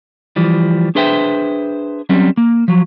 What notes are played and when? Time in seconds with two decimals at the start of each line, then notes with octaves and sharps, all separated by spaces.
0.36 E3 F3 G3
0.95 D4 G#4 B4 C5 E5 G5
2.09 F#3 G3 C4 C#4
2.37 A#3
2.68 F3 F#3